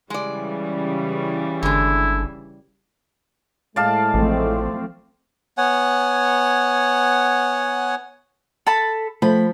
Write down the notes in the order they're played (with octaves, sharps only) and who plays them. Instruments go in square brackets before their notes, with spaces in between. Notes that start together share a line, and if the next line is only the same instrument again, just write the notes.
[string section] C#3 E3 G3 [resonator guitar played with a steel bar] G#3 D5
[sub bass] G1 [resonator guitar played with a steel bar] D3 G#3 [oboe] E4
[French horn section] A2 G#3 [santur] D5 F5 A5
[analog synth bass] A1 [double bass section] F3 A3 C4
[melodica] B3 C#5 F#5 G#5
[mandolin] A4 A5 B5
[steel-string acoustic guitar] F3 [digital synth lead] A3 [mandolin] B5